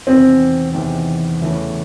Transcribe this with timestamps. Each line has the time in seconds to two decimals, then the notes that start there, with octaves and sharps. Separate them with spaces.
0.07 E2 C3 D#3 C4
0.74 E2 C3 D#3
1.40 E2 C#3 E3 A3 C#4